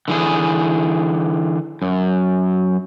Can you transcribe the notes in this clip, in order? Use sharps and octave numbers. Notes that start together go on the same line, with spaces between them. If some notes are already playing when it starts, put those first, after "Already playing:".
D3 E3 G#4
F#2